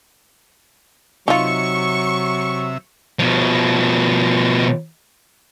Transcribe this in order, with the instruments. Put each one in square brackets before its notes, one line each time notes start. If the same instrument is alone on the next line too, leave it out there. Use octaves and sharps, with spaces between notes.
[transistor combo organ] C3 E5 [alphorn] F#3 [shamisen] D#4 F4 [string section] C#6
[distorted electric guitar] B2 F3